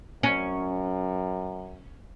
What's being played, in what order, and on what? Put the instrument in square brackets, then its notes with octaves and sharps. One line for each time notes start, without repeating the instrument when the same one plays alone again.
[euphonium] F#2 [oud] C#4